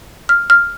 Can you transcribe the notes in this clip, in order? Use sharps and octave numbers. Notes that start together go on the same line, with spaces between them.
F6
F6